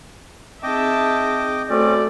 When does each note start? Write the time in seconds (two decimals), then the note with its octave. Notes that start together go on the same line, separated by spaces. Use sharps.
0.63 C4 D#4 G#4 D#5 E5 G5 A5 D6
1.70 A3 C4 C#4 F#4 D5 C6